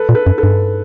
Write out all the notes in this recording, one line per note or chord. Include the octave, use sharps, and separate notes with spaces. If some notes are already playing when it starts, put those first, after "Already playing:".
Already playing: A4 B4
A#2
A4 B4
F#2
A4 B4
G2